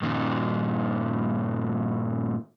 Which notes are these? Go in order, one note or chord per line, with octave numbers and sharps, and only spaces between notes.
G2 A#2 D#3